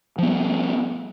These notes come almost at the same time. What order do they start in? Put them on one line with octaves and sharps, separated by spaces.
F3 B3 G3